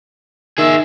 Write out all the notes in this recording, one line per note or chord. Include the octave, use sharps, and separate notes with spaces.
D#3 G#4 E5